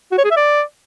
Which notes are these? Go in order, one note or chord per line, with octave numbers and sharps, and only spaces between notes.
F#4
C#5
G#4
E5
D5